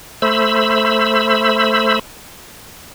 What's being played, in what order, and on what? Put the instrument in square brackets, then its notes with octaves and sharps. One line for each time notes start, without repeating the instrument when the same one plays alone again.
[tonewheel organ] A3 C5 B5 E6